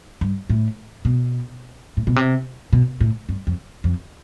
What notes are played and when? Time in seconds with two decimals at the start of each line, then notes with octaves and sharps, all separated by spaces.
0.21 G2
0.49 A2
1.05 B2
1.97 A2
2.07 B2
2.16 C3
2.73 B2
3.01 A2
3.29 G2
3.47 F2
3.84 F2